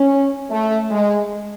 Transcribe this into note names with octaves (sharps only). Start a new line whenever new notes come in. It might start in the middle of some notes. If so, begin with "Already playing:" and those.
Already playing: C#4
A3
G#3